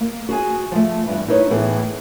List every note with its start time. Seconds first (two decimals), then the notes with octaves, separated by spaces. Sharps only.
0.01 A#3
0.29 F#4 G#4 G#5
0.72 F3 A3
1.06 E2 G2
1.28 D#4 E4 B4 C#5
1.50 A2 E3 A3 B3 G#4